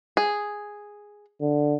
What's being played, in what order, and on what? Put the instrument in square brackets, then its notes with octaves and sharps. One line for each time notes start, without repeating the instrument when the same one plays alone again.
[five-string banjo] G#4
[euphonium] D3